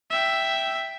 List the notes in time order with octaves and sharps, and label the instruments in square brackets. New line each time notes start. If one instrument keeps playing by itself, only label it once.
[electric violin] E5 G5